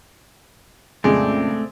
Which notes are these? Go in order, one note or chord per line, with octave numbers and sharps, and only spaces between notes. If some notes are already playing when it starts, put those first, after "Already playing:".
F2 A#2 C#3 G#3 A3 C4 D5